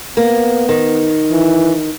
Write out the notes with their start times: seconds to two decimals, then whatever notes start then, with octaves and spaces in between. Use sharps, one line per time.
0.17 A#3 B3
0.69 D#3
1.31 E3